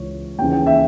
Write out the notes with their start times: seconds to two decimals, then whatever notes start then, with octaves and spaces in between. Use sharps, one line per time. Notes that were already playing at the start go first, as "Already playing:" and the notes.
Already playing: C#2 E3 C#5
0.38 D#2 G5
0.42 C#3 E3
0.53 G5
0.66 E5